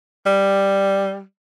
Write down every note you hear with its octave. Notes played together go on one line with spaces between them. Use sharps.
G3